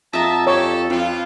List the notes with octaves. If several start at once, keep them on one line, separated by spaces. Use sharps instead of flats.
F2 D#5 E5 A5 A#5
G4 A4 C#5
F2 F3 F4 B4